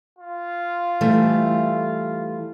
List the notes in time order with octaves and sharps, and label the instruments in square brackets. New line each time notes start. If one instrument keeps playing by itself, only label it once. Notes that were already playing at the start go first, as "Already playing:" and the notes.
[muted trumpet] F4
[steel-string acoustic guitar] E3 G3 A3